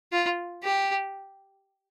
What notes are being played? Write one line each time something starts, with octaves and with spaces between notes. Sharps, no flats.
F4
G4